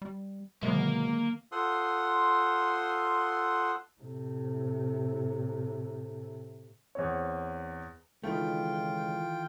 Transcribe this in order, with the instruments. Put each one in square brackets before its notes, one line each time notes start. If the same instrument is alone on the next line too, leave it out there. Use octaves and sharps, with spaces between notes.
[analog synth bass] G3
[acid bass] B2 [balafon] D3 D#3 F#3 [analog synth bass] G#3 [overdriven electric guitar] A#3
[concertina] F4 A4 C5 F#5 C6 D#6
[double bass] A2 C3
[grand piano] E2 C4 C#5
[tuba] C#2 [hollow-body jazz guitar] D#3 E3 A3 [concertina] F4 G5